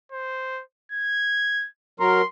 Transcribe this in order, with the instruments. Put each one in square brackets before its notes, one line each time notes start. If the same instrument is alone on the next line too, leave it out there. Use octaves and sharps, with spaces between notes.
[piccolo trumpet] C5
G#6
[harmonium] F#3 A#4 [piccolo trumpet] C6